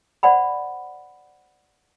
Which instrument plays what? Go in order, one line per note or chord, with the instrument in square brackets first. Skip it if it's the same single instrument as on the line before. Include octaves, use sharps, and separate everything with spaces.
[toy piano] C5 D5 F#5 G#5 B5